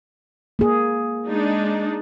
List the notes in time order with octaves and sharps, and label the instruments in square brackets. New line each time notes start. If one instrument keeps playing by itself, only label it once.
[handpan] A#3 G#4
[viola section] G#3 D4 D#4